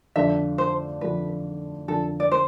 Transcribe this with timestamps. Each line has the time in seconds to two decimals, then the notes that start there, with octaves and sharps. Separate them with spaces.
0.16 F2 D3 A3 D4 F4 E5
0.58 C5
1.01 F2 D3 A3 D4 F4 B4
1.88 F2 D3 A3 D4 F4 A4
2.20 D5
2.31 C5